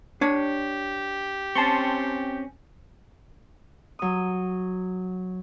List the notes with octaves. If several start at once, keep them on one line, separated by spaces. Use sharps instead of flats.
D4 G4 C#5
C4 C#4 A5 C6 C#6
F#3 D#6